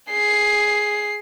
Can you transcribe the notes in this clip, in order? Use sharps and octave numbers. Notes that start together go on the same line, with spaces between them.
G#4 C7